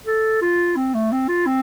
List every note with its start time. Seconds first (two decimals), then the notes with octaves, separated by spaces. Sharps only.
0.06 A4
0.42 F4
0.77 C4
0.94 A3
1.12 C4
1.29 F4
1.47 C4